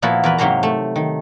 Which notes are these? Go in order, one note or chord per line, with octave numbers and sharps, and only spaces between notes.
A#2 F3 A#3 B3 E4 F#4
E2 A#4 B4
G#2 C3 F#3 A#3 C5 A#5
A3
D#3